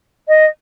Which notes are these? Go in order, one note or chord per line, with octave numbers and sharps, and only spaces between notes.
D#5